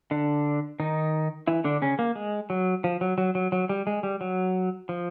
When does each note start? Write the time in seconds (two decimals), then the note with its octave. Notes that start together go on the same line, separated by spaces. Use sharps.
0.11 D3 D4
0.80 D#3 D#4
1.48 E3 E4
1.64 D3 D4
1.82 C#3 C#4
1.99 A#3
2.16 G#3
2.50 F#3
2.84 F3
3.01 F#3
3.18 F#3
3.35 F#3
3.52 F#3
3.69 G3
3.87 G#3
4.03 G3
4.21 F#3
4.89 F3